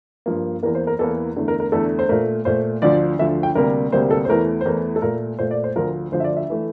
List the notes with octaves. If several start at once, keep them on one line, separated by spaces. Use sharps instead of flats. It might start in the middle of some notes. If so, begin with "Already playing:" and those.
G2 F3 A#3
E2 E3 A#3 A#4
C5
A#4
E2 E3 A#3 A4
E2 D3 A3
A#4
A#4
E2 D3 A3 A4
C5
A#2 A3 A#4
A#2 A3 C5
D2 D3 F3 D5
D2 D3 F3 E5
G5
D2 C3 G3 A#3 A#4
D2 C3 G3 A#3 C5
A4
C5
E2 E3 A3 A#4
C5
E2 E3 A3 A#4
A4
A#2 A3 A#4
A#2 A3 C5
D5
C5
D2 D3 F3 A#4
D2 D3 F3 C5
E5
D5
E5
E3 A3